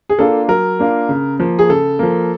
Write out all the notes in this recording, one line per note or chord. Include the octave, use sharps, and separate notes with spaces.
G#4
A#3 D4 F4 A4
F#3 A#4
A#3 D4 F4
C#3
F3 A#3
G#4
C#3 A4
F3 A#3